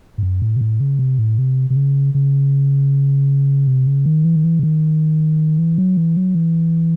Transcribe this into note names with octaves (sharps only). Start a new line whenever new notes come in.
G#2
F#2
A2
C3
A2
C#3
C3
A2
C3
C3
C#3
C#3
C3
C#3
D#3
E3
D#3
E3
C#3
D#3
E3
F#3
E3
F#3
E3